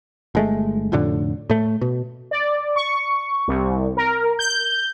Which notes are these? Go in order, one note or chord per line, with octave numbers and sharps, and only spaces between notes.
G1 G#3 A3
F1 F2 A2 D3
A2 A3
B2
D5
C#6
C2
A#4
G6